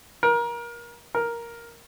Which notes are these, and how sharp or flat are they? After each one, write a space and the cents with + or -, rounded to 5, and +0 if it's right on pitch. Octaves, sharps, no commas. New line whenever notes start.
A#4 +25
A#4 +5